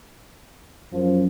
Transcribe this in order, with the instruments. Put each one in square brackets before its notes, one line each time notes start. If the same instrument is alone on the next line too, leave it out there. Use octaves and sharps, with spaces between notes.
[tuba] F#2 [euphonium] F3